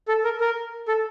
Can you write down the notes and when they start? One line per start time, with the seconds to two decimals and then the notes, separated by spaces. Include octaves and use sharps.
0.08 A4
0.24 A#4
0.40 A#4
0.88 A4